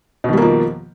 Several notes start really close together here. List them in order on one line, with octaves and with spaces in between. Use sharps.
B2 D#3 G3 A#3 F3